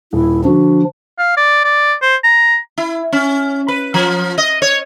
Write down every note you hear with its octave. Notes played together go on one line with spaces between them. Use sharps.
D#1 E4
D3 F3 D4 F#4
F5
D5
D5
C5
A#5
E4
C#4
B4
F3
D#5
C#5